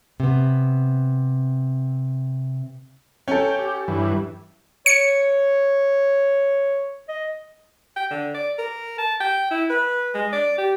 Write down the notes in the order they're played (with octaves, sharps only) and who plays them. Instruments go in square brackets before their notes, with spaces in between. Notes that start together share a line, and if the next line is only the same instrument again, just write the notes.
[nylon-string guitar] C3 B3
[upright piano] C#4 A4 [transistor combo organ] G5
[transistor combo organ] G4
G2 E3
[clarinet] C#5 [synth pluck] C#7
[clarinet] D#5
[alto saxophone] G5
D3
D5
A#4
A5
G5
E4
B4
G#3
D5
G4